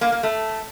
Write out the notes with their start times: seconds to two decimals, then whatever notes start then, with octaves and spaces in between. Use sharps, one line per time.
0.01 A#3
0.12 A#3
0.23 A3